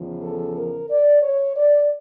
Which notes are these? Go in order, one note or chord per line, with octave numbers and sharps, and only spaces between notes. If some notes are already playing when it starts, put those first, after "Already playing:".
Already playing: E2 C#3 F3
A4
A#4
D5
C#5
D5